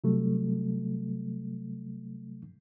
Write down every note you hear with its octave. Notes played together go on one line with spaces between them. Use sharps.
C3 F#3 G3 A3